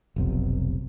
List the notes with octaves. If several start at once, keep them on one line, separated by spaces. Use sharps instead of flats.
F1 B1 C3